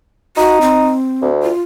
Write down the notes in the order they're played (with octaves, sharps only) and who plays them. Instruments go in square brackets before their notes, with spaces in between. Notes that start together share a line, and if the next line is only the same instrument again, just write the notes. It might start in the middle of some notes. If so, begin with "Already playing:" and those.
[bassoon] D#4 [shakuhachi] F#4
[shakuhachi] C4
[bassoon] D2
[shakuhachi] F4